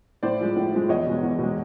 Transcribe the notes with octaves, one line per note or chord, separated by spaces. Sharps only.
A2 C5 D5
F3 G#3
A2
F3 G#3
E2 C#5 D#5
B2 G#3
E2
B2 G#3